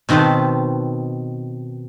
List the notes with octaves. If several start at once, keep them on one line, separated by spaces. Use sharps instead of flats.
B2 D#3 C4 B4 A5